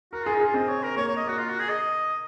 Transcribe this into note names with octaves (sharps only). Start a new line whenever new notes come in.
F#4 A#4
F4 G#4
D#4
F4 G#4
C4 D#5
C#5
A#4
A#3 C#5
C#5
D#5
A#3 F#4
F4
F#4
G#4
D#5